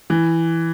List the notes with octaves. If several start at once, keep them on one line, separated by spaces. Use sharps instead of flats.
E3